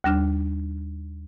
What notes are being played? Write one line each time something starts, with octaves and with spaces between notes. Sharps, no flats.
D#2 G3 D4 F6